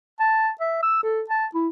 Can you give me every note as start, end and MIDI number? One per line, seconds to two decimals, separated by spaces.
0.20 0.51 81
0.60 0.80 76
0.83 1.00 88
1.03 1.22 69
1.30 1.46 81
1.54 1.68 64